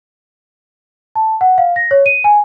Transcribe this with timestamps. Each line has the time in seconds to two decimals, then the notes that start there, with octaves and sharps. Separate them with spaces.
1.16 A5
1.41 F#5
1.58 F5
1.76 A#6
1.91 C#5
2.06 D#7
2.24 G#5